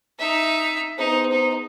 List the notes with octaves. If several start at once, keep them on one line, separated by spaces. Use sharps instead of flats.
D#4 E5
B3 D#4 G#4 C5
D#4